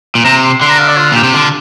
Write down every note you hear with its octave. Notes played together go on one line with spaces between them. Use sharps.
A#2
C3 A#5
C6
D3 C6
A#5
F5
D5
F4
A#2 G4
C3
D3 F4